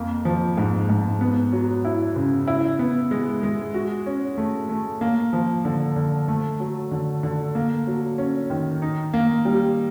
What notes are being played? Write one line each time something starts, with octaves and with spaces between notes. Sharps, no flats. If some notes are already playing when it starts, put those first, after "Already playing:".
Already playing: F2 A#3
F3
G#2
G#2
B3
F#3
E4
C#3
E4
B3
G#3
G#3
F#4
C#4
A3
A3
A#3
F3
D3
D3
A3
F#3
D3
D3
A#3
F#3
C#4
D#3
D#4
A#3
G3